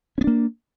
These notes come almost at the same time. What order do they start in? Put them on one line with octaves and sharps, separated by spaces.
C#4 B3 D4 A#3